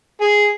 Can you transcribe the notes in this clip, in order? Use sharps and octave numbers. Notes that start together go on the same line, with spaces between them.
G#4